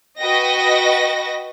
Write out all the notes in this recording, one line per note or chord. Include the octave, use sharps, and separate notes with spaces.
F#4 B4 D#5 G5 A#6